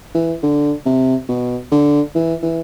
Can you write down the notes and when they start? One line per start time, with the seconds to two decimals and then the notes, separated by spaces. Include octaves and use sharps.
0.14 E3
0.43 D3
0.85 C3
1.28 B2
1.72 D3
2.15 E3
2.43 E3